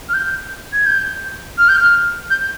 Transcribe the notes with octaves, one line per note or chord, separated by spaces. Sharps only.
F6
G6
G#6
G6
F6
G6
F6
G6